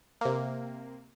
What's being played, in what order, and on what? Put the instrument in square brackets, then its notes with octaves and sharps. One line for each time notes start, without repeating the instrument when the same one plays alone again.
[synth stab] C3 A#3